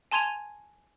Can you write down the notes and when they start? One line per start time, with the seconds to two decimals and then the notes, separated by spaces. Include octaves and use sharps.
0.12 G#5 A5 C6 G#6 D#7 F7